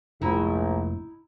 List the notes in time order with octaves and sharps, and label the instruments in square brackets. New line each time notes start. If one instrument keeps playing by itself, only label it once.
[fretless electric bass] F1 G#2 A3 [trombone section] A#1 [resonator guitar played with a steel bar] D#4 E4